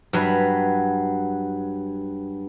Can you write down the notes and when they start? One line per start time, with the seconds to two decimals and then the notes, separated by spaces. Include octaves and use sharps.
0.13 G2 F#3 B4